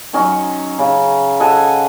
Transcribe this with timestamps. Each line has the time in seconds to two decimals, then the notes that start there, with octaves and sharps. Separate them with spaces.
0.13 D#3 F#3 C#4 D#5
0.79 C#3
1.40 A4 D#5 F#5 G#5